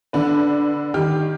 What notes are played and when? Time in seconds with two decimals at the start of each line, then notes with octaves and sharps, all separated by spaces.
0.13 D3 D4 B4
0.94 D#3 G4 F6